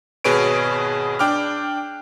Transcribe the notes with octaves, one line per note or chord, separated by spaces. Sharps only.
G#1 B2 G#4 B4 C#5 D7
D4 G5 D6 F6